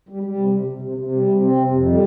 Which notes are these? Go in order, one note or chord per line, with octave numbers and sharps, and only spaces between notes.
G3
G3
C3
C3
C3
C3
C3
G3
C3
C4
C3
F2
G3